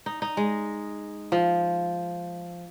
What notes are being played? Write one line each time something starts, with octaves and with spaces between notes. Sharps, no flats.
D#4
D#4
G#3
F3